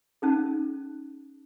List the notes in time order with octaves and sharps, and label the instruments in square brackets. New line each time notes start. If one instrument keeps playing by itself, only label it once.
[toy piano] C#4 D#4 G#4